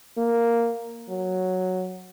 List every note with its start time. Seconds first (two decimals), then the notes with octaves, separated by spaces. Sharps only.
0.17 A#3
1.09 F#3